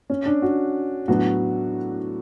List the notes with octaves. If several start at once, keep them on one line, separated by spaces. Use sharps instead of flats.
C#4
D4
F#4
A2 F#3 B3 D4 F#4